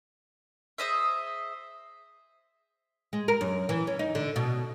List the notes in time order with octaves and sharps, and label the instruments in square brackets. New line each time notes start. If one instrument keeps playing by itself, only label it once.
[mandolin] G#4 C5 D#5 E5
[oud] G#3
A#4
F#2
E3
C#4
D#4
D3
B2